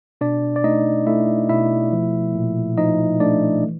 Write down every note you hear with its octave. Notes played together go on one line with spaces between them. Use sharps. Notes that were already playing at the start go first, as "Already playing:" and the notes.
B2 D4 D5
D5
A3 D#4 D#5
A3 E4 E5
B2 E4 E5
F3
A#2
F3 D#4 D#5
A3 D4 D5
E3